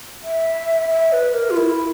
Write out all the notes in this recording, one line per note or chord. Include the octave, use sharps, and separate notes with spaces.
E5
E5
B4
A#4
F4
E4